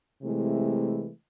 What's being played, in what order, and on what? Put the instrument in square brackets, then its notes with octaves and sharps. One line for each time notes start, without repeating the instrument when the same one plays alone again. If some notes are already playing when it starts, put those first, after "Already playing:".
[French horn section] C3 E3 G#3 A3 E4